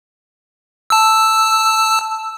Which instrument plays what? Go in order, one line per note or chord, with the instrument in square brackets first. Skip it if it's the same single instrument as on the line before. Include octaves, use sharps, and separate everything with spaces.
[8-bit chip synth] A5 E6